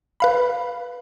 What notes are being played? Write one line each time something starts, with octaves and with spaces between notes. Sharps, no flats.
B4 F5 B5